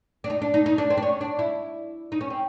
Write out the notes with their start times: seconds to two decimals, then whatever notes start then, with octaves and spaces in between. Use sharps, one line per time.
0.24 D4
0.30 D#4
0.42 D4
0.54 D#4
0.66 D#4
0.78 D4
0.90 C4
0.97 D4
1.03 C#4
1.21 D4
1.39 E4
2.12 D#4
2.21 C#4
2.30 C4